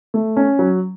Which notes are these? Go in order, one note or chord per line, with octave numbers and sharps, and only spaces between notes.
A3
C#4
F#3